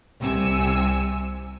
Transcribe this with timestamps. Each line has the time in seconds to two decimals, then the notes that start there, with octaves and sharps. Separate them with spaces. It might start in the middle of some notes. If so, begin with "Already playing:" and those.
0.20 C2 C3 G#5 E6